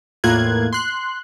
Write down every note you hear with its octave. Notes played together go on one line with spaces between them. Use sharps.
E2 A2 A#3 F4 F#6 G#6
C6 F#6